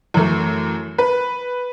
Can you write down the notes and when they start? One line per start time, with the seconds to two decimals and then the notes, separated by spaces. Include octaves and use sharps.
0.14 F#2 E3 A3
0.98 B4